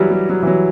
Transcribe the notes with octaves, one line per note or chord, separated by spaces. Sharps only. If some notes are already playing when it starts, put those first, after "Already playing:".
Already playing: E3 F#3 G3
G3
F#3
E3
F#3